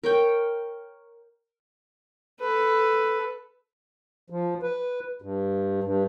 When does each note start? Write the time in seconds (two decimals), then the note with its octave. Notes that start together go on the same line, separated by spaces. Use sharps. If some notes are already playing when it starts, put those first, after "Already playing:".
0.03 A#4 C#5 G5
2.40 A4 B4
4.30 F3
4.62 B4
5.22 G2
5.83 G2